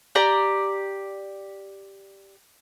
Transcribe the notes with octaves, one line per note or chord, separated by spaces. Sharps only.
G4 D5 A#5